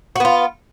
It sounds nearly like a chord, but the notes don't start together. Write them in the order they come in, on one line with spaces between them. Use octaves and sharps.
F#4 B3 F4